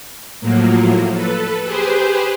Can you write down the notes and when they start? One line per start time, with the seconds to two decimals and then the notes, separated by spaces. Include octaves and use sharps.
0.41 A2 F3 F#3 A#3
1.13 A4 B4
1.65 G4 G#4 B4 C5